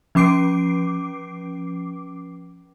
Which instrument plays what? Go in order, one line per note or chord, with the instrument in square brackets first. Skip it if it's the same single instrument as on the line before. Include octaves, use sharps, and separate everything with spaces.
[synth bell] F3 C#4 D6 C7 D7